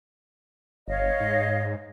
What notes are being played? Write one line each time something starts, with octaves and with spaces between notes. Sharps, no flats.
G1 C#5 D#5 F5
G#2